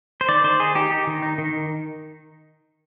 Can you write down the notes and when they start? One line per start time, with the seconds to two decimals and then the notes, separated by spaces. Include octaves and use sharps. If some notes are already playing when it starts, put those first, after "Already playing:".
0.21 C5
0.28 D#3 D5
0.44 D#3 C5
0.60 D#4 G#4
0.75 D#4 G4
0.91 D#4
1.07 D#3
1.22 D#4
1.38 D#3